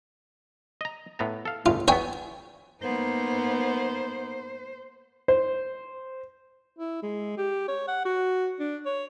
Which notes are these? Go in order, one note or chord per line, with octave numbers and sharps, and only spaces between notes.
D#5 A#5
A2 B3 A#5
A4 F5
G1 C#2 A2 F4
E2 F#3 B3 C#5 G5 G#5
A#3 B3 D#4 C5
C5
E4
G#3
G4
C#5
F#5
F#4
D4
C#5